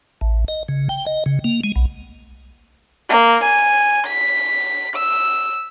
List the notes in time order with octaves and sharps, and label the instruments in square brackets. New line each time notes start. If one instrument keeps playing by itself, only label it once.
[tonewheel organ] A1
D#5
C#3
G5
D#5
C#3
A#3
G#3
B1
[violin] A#3
G#5
B6
E6